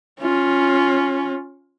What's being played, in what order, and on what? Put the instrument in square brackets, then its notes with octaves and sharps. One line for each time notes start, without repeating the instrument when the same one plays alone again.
[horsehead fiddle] C#4 F4